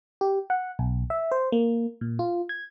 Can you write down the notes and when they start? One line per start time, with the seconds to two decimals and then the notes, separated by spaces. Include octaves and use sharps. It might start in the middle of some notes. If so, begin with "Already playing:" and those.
0.21 G4
0.50 F#5
0.79 B1
1.10 E5
1.31 C5
1.52 A#3
2.01 A#2
2.19 F4
2.49 G#6